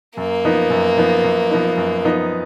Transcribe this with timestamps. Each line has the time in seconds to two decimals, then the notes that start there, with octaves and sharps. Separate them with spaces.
0.17 F#2 A#3
0.45 F3 B3 D#4
0.70 F#2
0.97 F3 B3 D#4
1.24 F#2
1.51 F3 B3 D#4
1.77 F#2
2.05 F3 B3 D#4